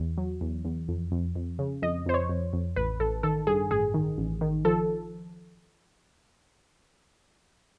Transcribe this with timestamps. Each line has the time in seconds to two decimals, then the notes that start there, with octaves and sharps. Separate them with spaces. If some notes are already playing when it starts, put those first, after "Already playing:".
Already playing: E2
0.18 F#3
0.41 E2
0.65 E2
0.88 F2
1.12 F2
1.36 F2
1.59 C#3
1.82 F2 D#5
2.06 F2 C5
2.14 C#5
2.29 F2
2.53 F2
2.76 A1 B4
3.00 A1 A4
3.23 D#3 A4
3.47 G2 G#4
3.71 A1 G#4
3.94 D#3
4.18 A1
4.41 D#3
4.65 F3 A4